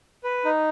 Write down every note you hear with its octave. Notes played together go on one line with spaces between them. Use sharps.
B4
D#4